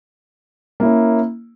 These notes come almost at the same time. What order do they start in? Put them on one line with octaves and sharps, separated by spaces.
A#3 E4 C#4